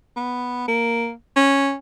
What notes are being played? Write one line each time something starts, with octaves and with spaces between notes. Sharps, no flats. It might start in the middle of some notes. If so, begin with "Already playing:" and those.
B3
A#3
C#4